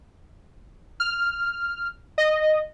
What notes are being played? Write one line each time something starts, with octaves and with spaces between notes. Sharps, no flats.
F6
D#5